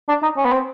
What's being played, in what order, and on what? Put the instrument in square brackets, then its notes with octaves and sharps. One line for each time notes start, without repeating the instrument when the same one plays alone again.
[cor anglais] D4
D#4
C#4
B3
C4